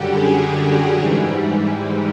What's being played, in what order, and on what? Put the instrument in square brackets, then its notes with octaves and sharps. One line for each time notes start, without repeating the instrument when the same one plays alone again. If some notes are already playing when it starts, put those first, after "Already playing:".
Already playing: [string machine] F#2 D3 G3 F#4 G4
G#4
G#2 E3 G3